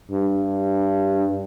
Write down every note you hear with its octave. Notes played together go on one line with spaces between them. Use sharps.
G2